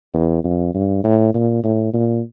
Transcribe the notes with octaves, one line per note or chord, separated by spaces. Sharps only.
E2
F2
G2
A2
A#2
A2
A#2